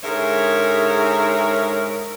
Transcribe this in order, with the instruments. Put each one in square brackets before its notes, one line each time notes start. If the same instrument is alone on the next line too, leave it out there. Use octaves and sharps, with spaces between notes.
[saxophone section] G#2 D3 G#4 A#4 C#5 E5